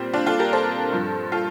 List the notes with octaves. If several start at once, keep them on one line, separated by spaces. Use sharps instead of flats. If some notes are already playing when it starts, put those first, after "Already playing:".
Already playing: A#2 G3 C4
D4 F4
F4 A4
G4 A#4
A4 C5
G2 F3
F4 A4